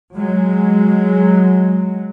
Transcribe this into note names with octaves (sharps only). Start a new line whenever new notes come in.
F#3 G#3